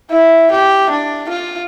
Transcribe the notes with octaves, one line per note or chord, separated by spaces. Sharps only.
E4
G4
D4
F4